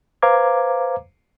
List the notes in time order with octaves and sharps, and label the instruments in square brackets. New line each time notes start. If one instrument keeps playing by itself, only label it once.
[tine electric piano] B4 C5 F5 A#5 D6 G#6